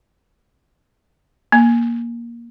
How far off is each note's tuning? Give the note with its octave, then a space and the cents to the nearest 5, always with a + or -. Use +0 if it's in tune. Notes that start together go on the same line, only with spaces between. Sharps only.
A#3 +10